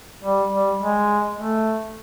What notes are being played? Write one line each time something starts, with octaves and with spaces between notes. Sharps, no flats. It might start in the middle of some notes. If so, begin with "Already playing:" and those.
G3
G3
G#3
A3